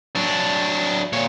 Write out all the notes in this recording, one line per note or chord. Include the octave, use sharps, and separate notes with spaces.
F#3 D4
A#2 C#5